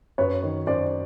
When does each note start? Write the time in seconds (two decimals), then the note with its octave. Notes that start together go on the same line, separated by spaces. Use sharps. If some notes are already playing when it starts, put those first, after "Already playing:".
0.18 F#2 B4 C#5
0.43 D#3
0.66 F#2 C5 D5